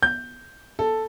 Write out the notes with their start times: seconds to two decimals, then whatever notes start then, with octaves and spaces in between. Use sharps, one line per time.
0.03 G6
0.79 A4